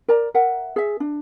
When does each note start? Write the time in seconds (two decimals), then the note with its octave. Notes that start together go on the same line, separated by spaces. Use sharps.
0.08 A#4 D5 A#5
0.34 A#4 E5 F#5
0.76 G#4 E5
1.00 D4